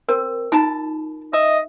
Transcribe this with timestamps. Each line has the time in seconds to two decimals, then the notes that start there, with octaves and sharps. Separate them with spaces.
0.09 C4 A#4
0.52 D#4 F4 A#4 A5
1.33 D#5 E5